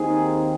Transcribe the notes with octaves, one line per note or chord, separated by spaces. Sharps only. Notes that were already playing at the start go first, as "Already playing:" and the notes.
Already playing: D#2 D#3 C4 D#4 G#4